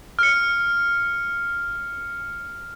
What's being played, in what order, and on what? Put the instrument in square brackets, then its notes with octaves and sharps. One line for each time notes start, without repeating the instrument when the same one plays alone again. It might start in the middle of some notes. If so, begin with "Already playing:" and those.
[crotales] F6 C#7